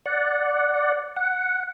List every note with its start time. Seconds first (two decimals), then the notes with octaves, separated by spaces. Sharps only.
0.06 D5 F#5
1.16 F#5